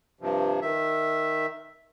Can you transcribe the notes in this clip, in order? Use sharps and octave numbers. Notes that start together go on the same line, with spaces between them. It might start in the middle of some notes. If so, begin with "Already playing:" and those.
G2 C3 F3
D#3 E5